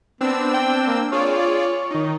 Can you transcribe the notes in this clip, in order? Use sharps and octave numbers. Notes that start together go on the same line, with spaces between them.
B3 C4 D4 E6
G5
A#3
F4 G#4 C#5 D5
D#3 D#4